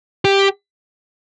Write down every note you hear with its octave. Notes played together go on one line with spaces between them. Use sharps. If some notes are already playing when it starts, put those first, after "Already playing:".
G4